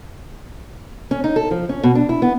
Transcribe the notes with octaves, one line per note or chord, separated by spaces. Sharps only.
C#4
D#4
A4
F3
C#4
B2
D4
E4
B3